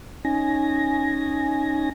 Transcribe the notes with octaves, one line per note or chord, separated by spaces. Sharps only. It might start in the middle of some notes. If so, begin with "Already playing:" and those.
C#4 D#4 G#5 A#6